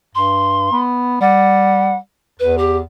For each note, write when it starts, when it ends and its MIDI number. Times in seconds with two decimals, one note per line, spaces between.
0.15 0.71 43
0.15 0.81 84
0.72 1.20 59
1.21 1.97 55
1.21 1.95 78
2.40 2.81 40
2.40 2.55 71
2.58 2.77 67